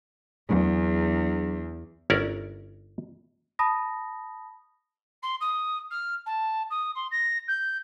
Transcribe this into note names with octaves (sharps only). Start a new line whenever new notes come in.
E2 F#3 D4 G#4
G1 C#4 E4 A#4 D5
A5 B5 D#6 A#6
C6
D#6
F6
A5
D#6
C6
A#6
G6